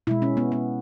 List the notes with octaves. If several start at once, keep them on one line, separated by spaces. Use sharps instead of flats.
B2 G#3 E4
C#4
B3
B3